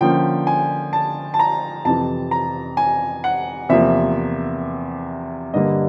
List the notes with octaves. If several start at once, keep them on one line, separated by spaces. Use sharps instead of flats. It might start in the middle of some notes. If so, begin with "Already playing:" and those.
D3 F3 A#3 C#4 G5
G#5
A5
A5
A#5
F2 C3 E3 A5
A#5
G#5
F#5
E2 C3 F3 A#3 E5
G2 D3 G3 A#3 D#5